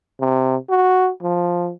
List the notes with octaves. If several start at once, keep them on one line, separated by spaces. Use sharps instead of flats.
C3
F#4
F3